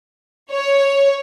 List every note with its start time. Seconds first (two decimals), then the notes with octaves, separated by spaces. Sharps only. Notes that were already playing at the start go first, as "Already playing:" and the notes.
0.51 C#5